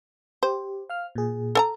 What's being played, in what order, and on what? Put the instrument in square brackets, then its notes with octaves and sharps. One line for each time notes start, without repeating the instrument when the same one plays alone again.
[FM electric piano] G4 [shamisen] C5
[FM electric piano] F5 F6
A#2 G#4
[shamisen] A4 G#5 A#5